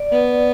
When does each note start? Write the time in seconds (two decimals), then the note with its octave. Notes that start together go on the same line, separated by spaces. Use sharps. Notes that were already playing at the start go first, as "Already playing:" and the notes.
Already playing: D5
0.12 B3